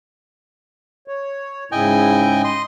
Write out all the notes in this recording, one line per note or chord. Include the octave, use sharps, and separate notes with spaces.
C#5
G#2 C#3 E4 D#5 G5 G#5
D#5 C6